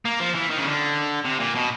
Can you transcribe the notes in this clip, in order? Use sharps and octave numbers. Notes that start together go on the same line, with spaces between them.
A#3
F3
E3
D#3
C#3
D3
C3
A#2
B2